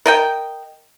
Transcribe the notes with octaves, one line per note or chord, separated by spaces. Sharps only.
A#4 D#5 G5